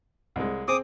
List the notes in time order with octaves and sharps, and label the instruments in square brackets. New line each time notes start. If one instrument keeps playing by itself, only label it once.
[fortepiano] C2 G#3
[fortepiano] C4 G#4 [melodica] D6 D#6